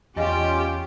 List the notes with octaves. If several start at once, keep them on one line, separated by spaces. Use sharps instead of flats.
E2 C#4 F4 G4 D5 D#5 F5